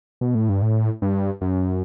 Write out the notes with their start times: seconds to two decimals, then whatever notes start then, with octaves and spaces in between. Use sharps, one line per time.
0.21 B2
0.35 A2
0.49 G2
0.62 A2
1.02 G2
1.41 F#2